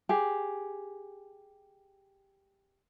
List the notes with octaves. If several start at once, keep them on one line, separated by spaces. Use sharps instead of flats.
G4 G#4